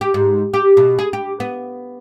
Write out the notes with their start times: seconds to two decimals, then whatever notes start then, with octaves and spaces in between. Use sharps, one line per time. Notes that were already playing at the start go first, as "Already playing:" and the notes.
0.01 G4
0.14 G#2
0.54 G4
0.77 B2
0.99 G#4
1.13 G4
1.40 B3